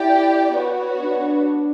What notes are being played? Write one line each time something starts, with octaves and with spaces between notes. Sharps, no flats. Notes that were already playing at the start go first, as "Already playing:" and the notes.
Already playing: E4 G4 D5 G5
B3 F#4 C#5
D4